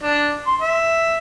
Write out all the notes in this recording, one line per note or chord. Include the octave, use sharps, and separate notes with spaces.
D4
C6
E5